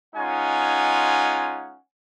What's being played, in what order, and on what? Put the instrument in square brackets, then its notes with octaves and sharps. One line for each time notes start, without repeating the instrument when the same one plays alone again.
[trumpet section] G#3 C#4 D#4 F4 F#5 G#5